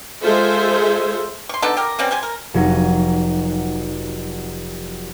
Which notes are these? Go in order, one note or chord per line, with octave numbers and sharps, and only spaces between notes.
G#3 F4 G#4 A4 C5 E5
C6 C#6
D3 B3 D#4 A4
G4 A#4
B2 G3 C4 C#4
C4 G4 G#5
A#4
F1 F#3 D#4